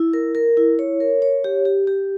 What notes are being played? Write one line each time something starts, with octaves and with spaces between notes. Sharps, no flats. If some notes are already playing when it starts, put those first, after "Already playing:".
Already playing: E4
A#4
A#4
E4
C#5
A#4
C#5
G4
G4
G4